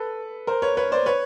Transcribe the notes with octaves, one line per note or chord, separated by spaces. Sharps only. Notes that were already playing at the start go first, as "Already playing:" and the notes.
Already playing: A4 B4
A#4 C5
B4 C#5
B4 C#5
C5 D5
B4 C#5